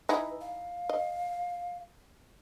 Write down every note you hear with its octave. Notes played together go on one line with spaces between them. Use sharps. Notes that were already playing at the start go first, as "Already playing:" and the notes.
D#4 E4 G#4 B4
F5
D#5